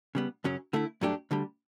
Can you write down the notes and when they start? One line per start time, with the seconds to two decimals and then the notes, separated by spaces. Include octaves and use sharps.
0.15 C#3 G3 B3
0.44 F#2 C#3 F#3 C#4
0.73 D3 A3 E4
1.01 G2 F#3 A3 D4 G4
1.31 D2 D3 G3